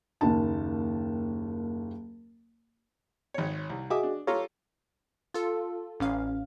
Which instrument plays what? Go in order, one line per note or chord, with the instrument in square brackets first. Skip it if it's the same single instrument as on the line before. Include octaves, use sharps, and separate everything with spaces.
[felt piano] F#1 D#2 D#3 A5
[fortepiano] G#1 C#5
C2
[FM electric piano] F#4 G#4 D#5 [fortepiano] E5 D6 D#6
[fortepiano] D4
[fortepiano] F4 G4 A4 [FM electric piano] C#5 F5 A#5
[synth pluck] F4 A4
A1 C#4 F5